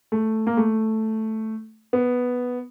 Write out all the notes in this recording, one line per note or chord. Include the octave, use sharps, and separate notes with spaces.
A3
A#3
A3
B3